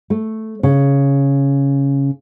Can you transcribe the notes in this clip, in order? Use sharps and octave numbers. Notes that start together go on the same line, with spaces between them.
A3
C#3